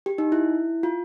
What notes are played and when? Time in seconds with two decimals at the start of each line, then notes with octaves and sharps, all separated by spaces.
0.06 G4
0.18 D#4
0.32 E4
0.83 F4